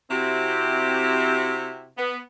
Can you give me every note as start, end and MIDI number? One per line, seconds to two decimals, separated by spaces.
0.11 1.88 48
0.11 1.88 60
0.11 1.88 64
0.11 1.88 66
0.11 1.88 67
1.98 2.17 59